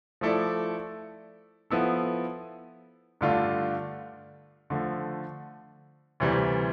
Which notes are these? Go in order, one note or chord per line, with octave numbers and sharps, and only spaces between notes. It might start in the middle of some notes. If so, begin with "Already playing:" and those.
F3 A3 E4 A4 D5
F3 B3 E4 A4
G2 D3 A3 D4 F4
D3 F3 A3
D2 C3 E3 G3